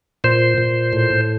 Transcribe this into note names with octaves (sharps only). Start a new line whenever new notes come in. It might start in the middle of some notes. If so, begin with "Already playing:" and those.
A#2 C5
A#2
A2